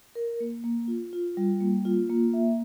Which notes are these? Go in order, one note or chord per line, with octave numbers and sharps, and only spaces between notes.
A#4
A#3
A#3
F4
F4
G3
A#3
F4
A#3
E5